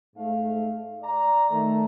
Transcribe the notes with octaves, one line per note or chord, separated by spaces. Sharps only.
G#2 A3 F5
D5 A#5
D#3 A3